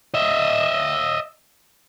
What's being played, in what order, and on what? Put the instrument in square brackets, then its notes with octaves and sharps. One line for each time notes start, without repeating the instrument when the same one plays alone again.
[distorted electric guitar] D#5 E5